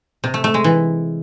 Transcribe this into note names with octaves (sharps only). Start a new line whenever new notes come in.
C3
A3
A3
G#3
E3